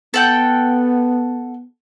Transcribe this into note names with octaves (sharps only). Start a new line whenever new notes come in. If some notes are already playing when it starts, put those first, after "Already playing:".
B3 A4 F#5 G5